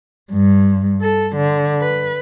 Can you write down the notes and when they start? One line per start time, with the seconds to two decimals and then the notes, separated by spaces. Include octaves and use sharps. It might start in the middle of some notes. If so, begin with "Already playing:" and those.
0.31 G2
1.02 A4
1.36 D3
1.81 B4